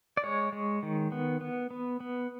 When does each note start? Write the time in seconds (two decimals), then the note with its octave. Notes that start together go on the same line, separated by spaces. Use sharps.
0.17 D5
0.23 G#3 C#5
0.53 G#3
0.83 D#3
1.12 B3
1.41 B3
1.71 B3
2.00 B3